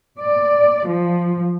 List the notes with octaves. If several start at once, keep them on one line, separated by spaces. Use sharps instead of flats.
D5
F3